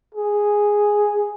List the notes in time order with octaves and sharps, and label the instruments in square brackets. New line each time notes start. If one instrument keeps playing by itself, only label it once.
[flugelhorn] G#4